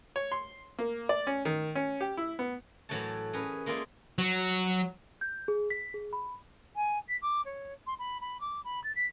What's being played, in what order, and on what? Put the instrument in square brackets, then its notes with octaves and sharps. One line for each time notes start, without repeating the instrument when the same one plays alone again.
[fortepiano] C#5
C6
A#3
D5
C#4
D#3
C#4
G4
E4
B3
[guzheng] A2 E3 F#3 A3 C#5 A5
C#4 G#4 A#4 B4
G#3 A#3 F4 G#4 D5 E5
[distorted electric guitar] F#3
[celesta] G6
G#4
B6
G#4
B5
[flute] G#5
B6
D6
C#5
C6
B5
B5
D6
B5
A6
B6